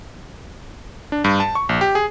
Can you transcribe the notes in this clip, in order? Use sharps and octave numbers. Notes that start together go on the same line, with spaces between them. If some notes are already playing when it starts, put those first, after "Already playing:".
D4
G2
A5
C#6
A#1
G4
G#4